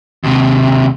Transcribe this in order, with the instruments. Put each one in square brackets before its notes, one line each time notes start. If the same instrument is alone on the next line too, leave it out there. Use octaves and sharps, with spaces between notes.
[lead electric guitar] D#2 C3